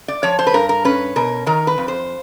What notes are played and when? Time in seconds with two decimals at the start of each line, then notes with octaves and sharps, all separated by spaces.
0.08 D5
0.23 F3 C#5
0.39 C5
0.47 B4
0.54 G2 A#4
0.69 A#4
0.85 C#4 B4
1.16 B2 A#4
1.46 D#3 A#4
1.67 B4
1.78 F2
1.88 C5